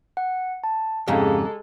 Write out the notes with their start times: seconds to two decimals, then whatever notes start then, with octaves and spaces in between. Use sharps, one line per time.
0.17 F#5
0.64 A5
1.08 F2 G#2 C#3 G#3 G4 A4 A#5